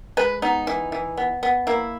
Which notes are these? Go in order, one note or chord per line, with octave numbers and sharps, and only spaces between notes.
G#3 B4
B3 D#4
E3
E3
B3
B3
A#3 E4